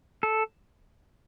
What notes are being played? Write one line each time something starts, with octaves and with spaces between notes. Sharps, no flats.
A4